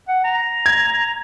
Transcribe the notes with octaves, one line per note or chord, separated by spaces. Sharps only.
F#5
A#5
G#6